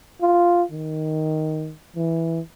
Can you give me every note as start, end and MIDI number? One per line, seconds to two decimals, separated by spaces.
0.22 0.63 65
0.71 1.72 51
1.96 2.40 52